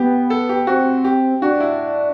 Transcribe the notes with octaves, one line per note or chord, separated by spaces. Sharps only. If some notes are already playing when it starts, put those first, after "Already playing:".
Already playing: B3 G4
A4
G4
C4 F#4
G4
D4 F#4
E4